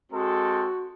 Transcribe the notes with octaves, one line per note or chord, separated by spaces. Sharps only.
G#3 C4 F#4 A4